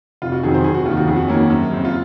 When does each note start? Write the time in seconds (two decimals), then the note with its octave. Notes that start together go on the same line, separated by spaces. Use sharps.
0.22 F1 F4
0.32 F#4
0.43 F2 D#3 F#3 G#4
0.54 C5
0.64 F1 G#4
0.74 F#4
0.85 D#2 F4
0.91 D#3
0.97 F#4
1.07 F2 G#4
1.16 F#4
1.28 D#3 A#3 C#4
1.50 F#2
1.71 C#3 G#3 C4
1.85 F4